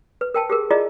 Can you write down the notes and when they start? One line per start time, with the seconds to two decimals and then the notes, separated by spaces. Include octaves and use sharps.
0.21 B4
0.34 A#4 G5 A5
0.50 G4 G#4 A#4
0.70 E4 F4 G#4 D5 D#5 A#5